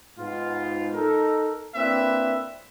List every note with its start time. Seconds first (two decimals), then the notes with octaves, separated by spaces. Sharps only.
0.18 G#2 B3 F4
0.94 D#4 A4 A#4
1.75 A#3 C4 D4 E4 B4 E5